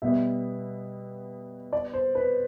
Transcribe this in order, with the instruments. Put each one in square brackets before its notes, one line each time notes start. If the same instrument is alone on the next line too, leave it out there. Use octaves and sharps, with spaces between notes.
[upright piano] B2 G3 B3 [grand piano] E5
[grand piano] D5
C5
B4